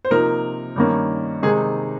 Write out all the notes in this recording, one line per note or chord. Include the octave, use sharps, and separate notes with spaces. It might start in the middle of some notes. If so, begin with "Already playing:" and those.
C5
C3 F3 A#3 D#4 A#4
G2 D#3 A#3 C#4
C3 D#3 G#3 D#4 G#4